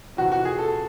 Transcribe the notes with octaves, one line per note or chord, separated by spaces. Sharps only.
F2 C3 E3 F#4
F#4
G#4
A4